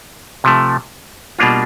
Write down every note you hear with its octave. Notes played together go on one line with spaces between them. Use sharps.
C3 F3 A3
B2 G3 A#3 D4 F4